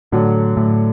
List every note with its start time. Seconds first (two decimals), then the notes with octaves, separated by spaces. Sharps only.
0.12 A2 D3 F#3
0.57 A2